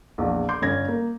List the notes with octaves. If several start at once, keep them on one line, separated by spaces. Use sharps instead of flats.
A#1 E2
C6 D6 G6
G1 C#4 G#6 A#6
A#3